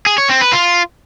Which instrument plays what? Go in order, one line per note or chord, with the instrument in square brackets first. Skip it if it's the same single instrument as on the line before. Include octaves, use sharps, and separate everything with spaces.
[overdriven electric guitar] G#4
C#5
C4
B4
F4